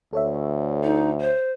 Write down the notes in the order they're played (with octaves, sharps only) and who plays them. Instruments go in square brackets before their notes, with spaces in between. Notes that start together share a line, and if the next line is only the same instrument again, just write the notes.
[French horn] D2 [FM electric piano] A4 C#5 E5
[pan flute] D#4
C5